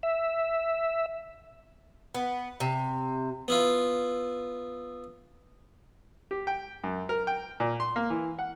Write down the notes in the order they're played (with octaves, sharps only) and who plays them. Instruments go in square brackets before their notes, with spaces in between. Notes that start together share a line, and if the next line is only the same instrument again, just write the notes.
[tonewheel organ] E5
[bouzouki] B3
C3
[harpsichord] B3 E4 F4
[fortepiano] G4
G5
F#2
A#4
G5
A#2
C6
A#3
E3
F#5